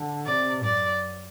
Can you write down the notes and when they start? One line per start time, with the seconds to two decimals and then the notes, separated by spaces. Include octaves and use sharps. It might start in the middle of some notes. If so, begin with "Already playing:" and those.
Already playing: D3
0.26 C3 D5
0.63 F#2 D5